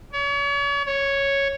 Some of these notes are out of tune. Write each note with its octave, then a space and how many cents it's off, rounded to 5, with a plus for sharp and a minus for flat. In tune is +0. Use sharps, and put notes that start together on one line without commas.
C#5 +40
C#5 +0